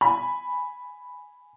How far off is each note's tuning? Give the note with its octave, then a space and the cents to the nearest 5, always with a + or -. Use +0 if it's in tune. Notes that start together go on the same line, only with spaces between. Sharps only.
G#5 +0 B5 +0